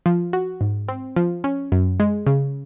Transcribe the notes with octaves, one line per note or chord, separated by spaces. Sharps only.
F3
F#4
G#2
C4
F3
C#4
F#2
G#3
C#3